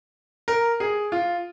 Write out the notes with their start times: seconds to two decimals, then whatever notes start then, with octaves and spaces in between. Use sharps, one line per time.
0.48 A#4
0.80 G#4
1.12 F4